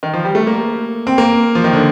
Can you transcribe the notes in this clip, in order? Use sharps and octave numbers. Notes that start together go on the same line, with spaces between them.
D#3
F3
G3
A3
A#3
C4
A#3
F3
D#3
D3